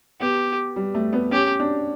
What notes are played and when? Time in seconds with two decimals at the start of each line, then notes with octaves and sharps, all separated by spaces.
0.20 B3 G4
0.76 G3
0.94 A3
1.13 B3
1.31 C#4 G4
1.60 D4